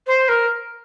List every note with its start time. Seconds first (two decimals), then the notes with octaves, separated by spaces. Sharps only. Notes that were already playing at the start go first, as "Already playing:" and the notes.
0.07 C5
0.28 A#4